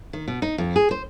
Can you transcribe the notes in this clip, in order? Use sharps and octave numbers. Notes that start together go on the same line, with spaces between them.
D#3
B2
D#4
F2
G#4
C5